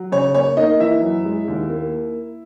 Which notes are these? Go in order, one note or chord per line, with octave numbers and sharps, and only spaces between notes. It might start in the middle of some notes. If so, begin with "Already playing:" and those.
Already playing: F#3
C#3 C#5
A#3 C#5
A#3 D#4 D#5
E3 E4 E5
F#2
G#3
D#2
A#3